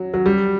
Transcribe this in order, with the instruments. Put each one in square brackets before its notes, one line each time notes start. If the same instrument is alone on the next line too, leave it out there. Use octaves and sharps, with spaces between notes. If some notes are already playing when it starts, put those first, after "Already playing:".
Already playing: [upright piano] F#3
F#3
G3